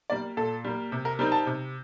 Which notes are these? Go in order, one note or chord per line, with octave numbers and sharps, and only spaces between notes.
G3 A#3 D5
A#2 A4
G3 A#3
C3
A#4
G3 C4 D#4 A#4
A5
C3